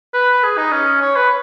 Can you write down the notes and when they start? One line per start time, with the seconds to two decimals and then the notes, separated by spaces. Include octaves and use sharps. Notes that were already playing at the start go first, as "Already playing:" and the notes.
0.14 B4
0.43 G#4
0.57 D#4
0.72 C#4
1.01 C#5
1.16 B4